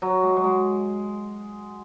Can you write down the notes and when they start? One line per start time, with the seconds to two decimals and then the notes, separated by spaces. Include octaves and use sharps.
0.02 F#3
0.23 G#3
0.36 F#3
0.44 G#3